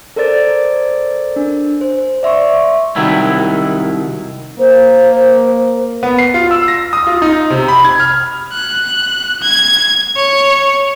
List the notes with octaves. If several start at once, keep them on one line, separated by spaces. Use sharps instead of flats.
A4 A#4 C5 D5 A6 D7
D4
C5
D5 E5 C6 C#6
C2 D#3 F#3 E4
A#3 C5
B3
C7
F4
E6
A#6
D#6
F4
D#4
C3
B5
G#6
F6
F#6
G#6
C#5